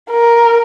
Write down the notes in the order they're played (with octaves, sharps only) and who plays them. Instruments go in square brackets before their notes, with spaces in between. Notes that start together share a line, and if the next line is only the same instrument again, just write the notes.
[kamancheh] A#4